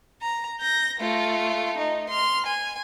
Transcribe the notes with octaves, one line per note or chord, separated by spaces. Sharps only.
A#5
G6 A#6
A3 F4
D#4
C6 F6
G#5